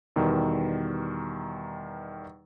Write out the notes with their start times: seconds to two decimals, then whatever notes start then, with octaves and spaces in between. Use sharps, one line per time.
0.16 E2 B2 D#3 G3